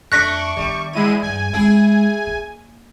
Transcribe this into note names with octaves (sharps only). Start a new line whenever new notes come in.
F2 A3 D4 C#6 F#6 A#6 B6
D#3 G3 B3
E2 G#3 E4 D#7
G2 G#5
G#3 C4 E4 G#4
A#3